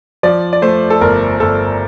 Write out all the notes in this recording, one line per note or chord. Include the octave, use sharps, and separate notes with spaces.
F3 D5
D5
A3 C5
A4
G1 A#4
G1 A4